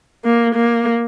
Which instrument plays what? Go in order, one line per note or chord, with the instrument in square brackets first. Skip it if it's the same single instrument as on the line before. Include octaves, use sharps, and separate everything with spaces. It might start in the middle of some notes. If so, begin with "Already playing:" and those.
[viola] A#3
A#3